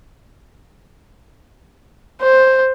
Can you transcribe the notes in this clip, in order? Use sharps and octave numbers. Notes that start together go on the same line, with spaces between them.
C5